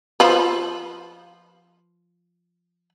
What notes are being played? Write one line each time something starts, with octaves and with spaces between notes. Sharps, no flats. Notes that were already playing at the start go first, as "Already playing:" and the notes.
F3 B4